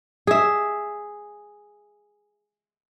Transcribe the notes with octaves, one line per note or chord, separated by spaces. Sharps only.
G#4 E5